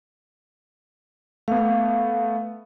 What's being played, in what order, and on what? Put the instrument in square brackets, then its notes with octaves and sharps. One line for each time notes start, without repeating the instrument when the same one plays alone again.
[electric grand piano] A3 B3 [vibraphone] F5